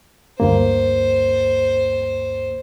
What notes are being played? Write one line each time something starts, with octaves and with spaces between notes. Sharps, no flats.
D2 G2 A#3 C5